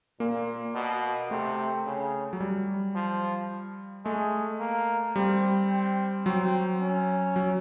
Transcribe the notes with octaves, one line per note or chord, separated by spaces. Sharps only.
A#2 A#3
B2
C3 A3
C#3
F#3
G3
F3
G#3 A3
A#3
G3 C4
C4
F#3 C4
C#4
F#3